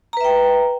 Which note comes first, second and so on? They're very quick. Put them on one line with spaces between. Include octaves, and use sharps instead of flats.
A#5 B4 E5 G5